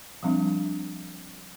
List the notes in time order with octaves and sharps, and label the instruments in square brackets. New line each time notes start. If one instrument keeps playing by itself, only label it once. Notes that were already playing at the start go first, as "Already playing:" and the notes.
[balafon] F3 G3 C4 D4 E5